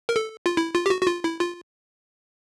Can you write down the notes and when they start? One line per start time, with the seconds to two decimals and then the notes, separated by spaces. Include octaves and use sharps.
0.09 A#4
0.16 A4
0.46 F4
0.57 E4
0.75 F4
0.86 G4
0.90 F#4
1.02 F#4
1.07 F4
1.24 E4
1.40 F4